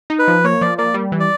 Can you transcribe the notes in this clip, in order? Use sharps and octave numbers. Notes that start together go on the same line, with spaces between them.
D#4
B4
F3
A#3 C#5
F3 D5
A#3 D5
G3
E3
D5